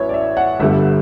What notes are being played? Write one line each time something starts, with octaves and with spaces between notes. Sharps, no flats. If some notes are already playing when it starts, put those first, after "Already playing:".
Already playing: A1 A2 F#3 B4 C#5 E5
D5
E5
F#5
G1 G2 D3 G3 E5